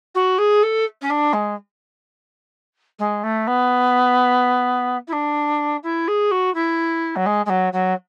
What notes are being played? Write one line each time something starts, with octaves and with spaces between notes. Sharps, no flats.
F#4
G#4
A4
C#4
D4
G#3
G#3
A3
B3
E4
D4
E4
G#4
F#4
E4
F#3
G#3
G#3
F#3
F#3